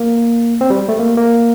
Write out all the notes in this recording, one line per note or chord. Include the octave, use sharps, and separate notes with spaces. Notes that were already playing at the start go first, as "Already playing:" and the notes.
Already playing: A#3
C4
G3
A3
A#3
A#3